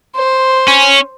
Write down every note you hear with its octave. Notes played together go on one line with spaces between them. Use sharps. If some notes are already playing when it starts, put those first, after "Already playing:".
C5
C#4